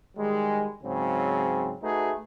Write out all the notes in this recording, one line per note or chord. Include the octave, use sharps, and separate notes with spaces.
D#3 G3 G#3
G#2 C#3 F#3 C4
A3 D#4 F#4 G#4 B4